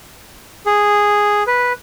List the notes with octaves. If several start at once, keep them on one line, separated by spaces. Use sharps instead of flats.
G#4
B4